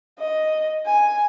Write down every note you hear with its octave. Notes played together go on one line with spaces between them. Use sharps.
D#5
G#5